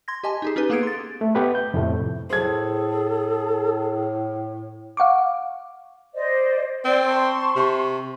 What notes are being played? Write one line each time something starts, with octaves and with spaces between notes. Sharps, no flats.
C6 G#6 A#6
G4 D#5 G#5 A5 C6
D#4 G4 G#4
C#4 D#4 G4 B4
A#3 B3 G#4 A4 G#6 D7
C6 A6
A3
B3 G4 B4
G6
F2 A2 C3 A3
A2 G#4 A4 C5 G#6
F5 F#5 C#6 D6
C5 D5 D#5
C4 D5
A5 C6 C#6
C3